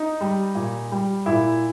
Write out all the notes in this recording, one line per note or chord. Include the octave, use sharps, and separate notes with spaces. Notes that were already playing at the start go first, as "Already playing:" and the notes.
Already playing: D#4
G3
A#2
G3
A#2 E4